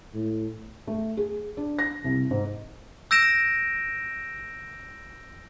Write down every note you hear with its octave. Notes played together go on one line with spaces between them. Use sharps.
A2
A3
G#4
D4
A#6
C2
G#2
E6 G6 A#6 D7 E7